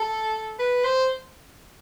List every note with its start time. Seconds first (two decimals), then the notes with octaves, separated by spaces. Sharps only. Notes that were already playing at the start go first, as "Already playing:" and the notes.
Already playing: A4
0.59 B4
0.84 C5